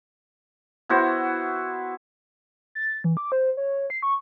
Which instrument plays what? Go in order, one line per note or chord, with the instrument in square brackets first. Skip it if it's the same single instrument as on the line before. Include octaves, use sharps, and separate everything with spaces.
[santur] B3 E4 F#4 C5
[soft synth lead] A6
E3
D6
C5
C#5
C7
C#6